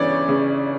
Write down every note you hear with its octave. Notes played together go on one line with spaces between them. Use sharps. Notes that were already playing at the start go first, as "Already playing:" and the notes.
Already playing: G1 C#3 E3 C#5 D5
C#3